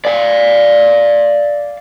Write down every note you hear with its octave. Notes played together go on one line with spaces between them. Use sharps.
D5 F5